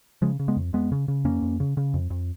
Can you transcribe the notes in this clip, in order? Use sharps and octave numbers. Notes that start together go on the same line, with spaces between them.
C#3 F3 G#3
C#3
G#3 B3
F2
F2 G#3 B3
C#3
C#3
F2 A#3 C#4
F2
C#3
C#3
F2
F2